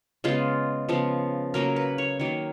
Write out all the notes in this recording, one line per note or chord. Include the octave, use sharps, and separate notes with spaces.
C#3 G#3 B3 F4
C#3 F3 B3
C#3 F#3 A#3 C#4 A#4
B4
C#5
D#3 F#3 A#3 C#5